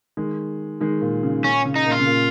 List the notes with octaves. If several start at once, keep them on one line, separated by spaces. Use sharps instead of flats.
D#3 G#3
D#3 G#3
A#2
C#3
A#2 C#4
C#3
D#4
A#2
F4
C#3
A#2